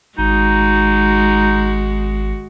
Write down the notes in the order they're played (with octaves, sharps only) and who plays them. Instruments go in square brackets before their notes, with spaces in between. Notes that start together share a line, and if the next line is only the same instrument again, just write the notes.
[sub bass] G#1 [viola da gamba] G#3 F#4 [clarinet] D#4